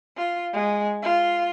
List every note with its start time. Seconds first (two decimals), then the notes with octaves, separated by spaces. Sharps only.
0.17 F4
0.53 G#3
1.02 F4